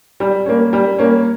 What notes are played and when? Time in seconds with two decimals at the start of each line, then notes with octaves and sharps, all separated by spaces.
0.20 G3
0.46 A#3 C#4
0.73 G3
0.98 A#3 C#4